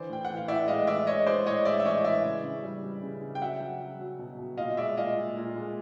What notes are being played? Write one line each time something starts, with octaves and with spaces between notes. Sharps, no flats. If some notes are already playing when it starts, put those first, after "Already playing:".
Already playing: D3 E3 C5 D5
A2 G5
F#5
E3
F5
A2 D5 E5
G#3 D#5 F5
E3 D5 E5
G#3 C#5 D#5
G#3 C5 D5
A2 C#5 D#5
G#3 D5 E5
E5
E3 C#5 D#5
E3 D5 E5
C#3
C#3
G3
G3
C#3
C#3
G5
F#3 E5 F#5
F#3
F#3
F#3
B2
B2
A#2 D#5 F5
G#3 D5 E5
A#2 D#5 F5
A#2
A#2
G#3